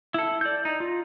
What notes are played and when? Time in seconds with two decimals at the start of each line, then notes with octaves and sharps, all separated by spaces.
0.14 E4 A4
0.41 D5 G6
0.65 D#4
0.80 F4